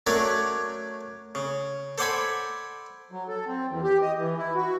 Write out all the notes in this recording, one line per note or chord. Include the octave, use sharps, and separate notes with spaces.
F#3 A3 C#4 D4 A#4 D5
C#3
A4 C5 D5 F#5 G#5 B5
F#3
A4
C4
E2
G4
D#5
E3
E4
F#4